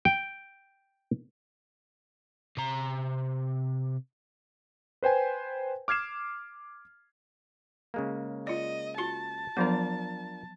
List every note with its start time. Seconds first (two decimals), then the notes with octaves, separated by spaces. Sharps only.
0.05 G5
2.57 C3 A#5
5.03 B4 C5 G5 G#5
5.88 D6 F6 G#6 C7 E7
7.94 C#3 G#3 A#3
8.47 F4 D5 D#5
8.98 F4 F#4 A5 C6
9.57 F3 F#3 B3 D4 F4 A#4